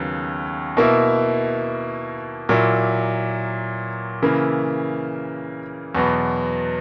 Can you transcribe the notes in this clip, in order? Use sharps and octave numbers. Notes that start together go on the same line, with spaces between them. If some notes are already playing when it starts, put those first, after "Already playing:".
Already playing: D#2 C#3 F#3 B3
B2 A#3 E4
A#2 F#3 A#3 E4
C#3 E3 A#3 E4
E2 B2 F#3 B3